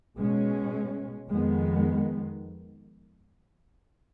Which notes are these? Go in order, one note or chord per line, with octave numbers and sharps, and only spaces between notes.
B2 G#3 C#4
F2 D#3 G#3 B3